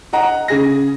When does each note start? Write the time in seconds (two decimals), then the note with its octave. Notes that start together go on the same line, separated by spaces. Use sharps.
0.13 D#5 F#5 A#5
0.48 C#3 G#4 A#6